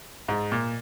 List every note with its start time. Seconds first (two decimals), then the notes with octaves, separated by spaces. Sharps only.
0.28 G#2
0.52 A#2